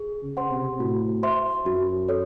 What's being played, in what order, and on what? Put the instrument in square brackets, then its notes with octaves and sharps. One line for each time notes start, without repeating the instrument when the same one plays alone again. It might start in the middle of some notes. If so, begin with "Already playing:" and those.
Already playing: [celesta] G#4
[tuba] C#3
[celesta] C5 F#5 C6
[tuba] C3
[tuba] A2 [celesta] F#4
[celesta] C5 E5 C6
[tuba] F#2 [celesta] F#4
[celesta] A4 C#5